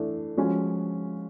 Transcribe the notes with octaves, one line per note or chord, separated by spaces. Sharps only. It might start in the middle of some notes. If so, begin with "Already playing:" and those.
Already playing: E3 A3 D4
F3 G#3 C#4 F#4